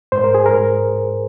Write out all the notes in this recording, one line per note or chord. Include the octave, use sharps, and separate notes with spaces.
G#2 C5
A#4
G#4
G#2 A#4